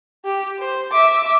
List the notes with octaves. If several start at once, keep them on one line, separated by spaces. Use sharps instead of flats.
G4
C5
E5 D6